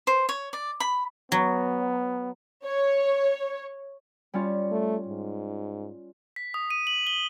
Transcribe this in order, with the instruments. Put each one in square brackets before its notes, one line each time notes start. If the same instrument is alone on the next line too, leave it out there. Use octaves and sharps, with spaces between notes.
[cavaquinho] C5
C#5
D5
B5
[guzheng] F#3 [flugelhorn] B3
[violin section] C#5
[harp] G3 C#4 F4
[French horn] A3
G#2
[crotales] B6
D#6
D#7
F#7
G7